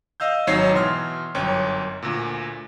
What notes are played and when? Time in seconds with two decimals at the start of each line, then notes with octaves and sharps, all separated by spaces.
0.20 D#5 F5 E6 G6
0.47 G#1 F#3 D#4 C#5 C7
0.72 B2 E3 C6 F6
1.35 G1 F#2 C#5 G5
2.02 D2 A#2